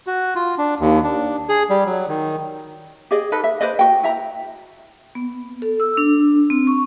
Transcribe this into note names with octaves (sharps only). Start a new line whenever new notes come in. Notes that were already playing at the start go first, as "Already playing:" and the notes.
F#4
F4
D4
D#2
D4
G#4
G3
F#3
D#3
G4 G#4 D5 D#5
D#4 A4 B4
E5
B4 C5 D5 D#5
F#4 G5
E4 E5 A#5
B3
A4
E6
D4
C4
C#6